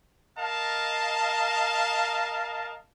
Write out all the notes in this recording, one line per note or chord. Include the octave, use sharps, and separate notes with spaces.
A#4 D#5 F5 A5